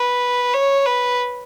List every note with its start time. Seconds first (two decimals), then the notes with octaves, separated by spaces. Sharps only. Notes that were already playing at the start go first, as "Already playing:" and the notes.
Already playing: B4
0.53 C#5
0.85 B4